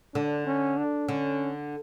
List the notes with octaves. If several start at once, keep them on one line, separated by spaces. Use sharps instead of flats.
D3 D4
C#4
D4
D3 C#4